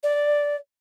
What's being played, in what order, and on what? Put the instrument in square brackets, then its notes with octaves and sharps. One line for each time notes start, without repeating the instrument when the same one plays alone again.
[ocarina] D5